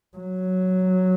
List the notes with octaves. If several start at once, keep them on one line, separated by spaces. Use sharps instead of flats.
F#3